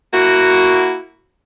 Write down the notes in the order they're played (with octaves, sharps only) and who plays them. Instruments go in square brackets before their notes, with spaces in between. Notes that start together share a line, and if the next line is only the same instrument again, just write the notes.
[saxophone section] A#3 E4 F#4